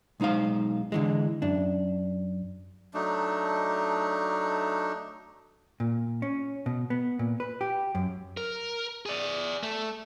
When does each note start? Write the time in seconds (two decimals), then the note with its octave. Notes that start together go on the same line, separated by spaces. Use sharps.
0.20 B1 G#3 D#4 C5 F5
0.92 D3 E3 G#3
1.42 F#2 D4
2.94 F#3 A3 D4 D#4
5.80 A#2
6.22 C#4
6.66 B2
6.90 B3
7.19 A#2
7.40 B4
7.61 G4
7.95 F#2
8.37 A#4
9.06 G#4 D5
9.63 A3